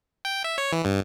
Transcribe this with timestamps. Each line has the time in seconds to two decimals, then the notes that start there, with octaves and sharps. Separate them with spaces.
0.25 G5
0.44 E5
0.58 C#5
0.72 E3
0.85 G2